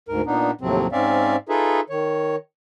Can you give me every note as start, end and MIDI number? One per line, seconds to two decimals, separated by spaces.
0.09 0.22 38
0.09 0.22 44
0.09 0.22 70
0.26 0.51 46
0.26 0.51 59
0.26 0.51 62
0.26 0.51 63
0.61 0.87 39
0.61 0.87 45
0.61 0.87 48
0.61 0.87 53
0.61 0.87 54
0.61 0.87 60
0.92 1.36 44
0.92 1.36 60
0.92 1.36 61
0.92 1.36 74
0.92 1.36 76
0.92 1.36 77
1.49 1.80 63
1.49 1.80 65
1.49 1.80 68
1.49 1.80 69
1.49 1.80 71
1.49 1.80 76
1.90 2.36 51
1.90 2.36 73